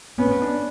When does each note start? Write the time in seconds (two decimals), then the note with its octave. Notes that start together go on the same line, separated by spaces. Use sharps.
0.18 B3 C#4
0.42 D4